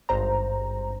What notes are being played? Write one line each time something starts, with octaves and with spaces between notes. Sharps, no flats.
G#1 G2 C5 A#5